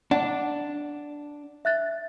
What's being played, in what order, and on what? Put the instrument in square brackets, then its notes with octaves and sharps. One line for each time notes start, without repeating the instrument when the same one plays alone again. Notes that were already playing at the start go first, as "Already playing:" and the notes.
[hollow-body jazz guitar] D4 [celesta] F#5
[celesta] E5 F#6 A6